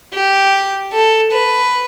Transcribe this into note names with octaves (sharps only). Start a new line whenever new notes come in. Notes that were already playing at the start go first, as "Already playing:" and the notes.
G4
A4
B4